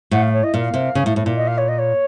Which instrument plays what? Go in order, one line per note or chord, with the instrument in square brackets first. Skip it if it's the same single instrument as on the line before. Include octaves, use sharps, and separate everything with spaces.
[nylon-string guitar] A2 [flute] F#5
[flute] F5
C#5
D#5
[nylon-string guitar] A#2 [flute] F5
[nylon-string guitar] C3
C#3
A2
A2
A#2
[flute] D#5
F5
C#5
D#5
C#5